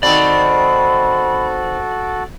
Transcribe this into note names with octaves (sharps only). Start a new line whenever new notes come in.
D#3 C4 F#4 A4 D5 B5